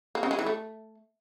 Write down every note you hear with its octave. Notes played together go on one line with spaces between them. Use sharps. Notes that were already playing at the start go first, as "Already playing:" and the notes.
A#3
C#3
G#3
E3
A3